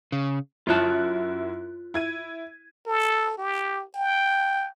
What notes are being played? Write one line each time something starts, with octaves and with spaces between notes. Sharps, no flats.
C#3
F#2 E4 F4 C#5 A5 F#6
E4 G#6 D#7
A4
G4
G5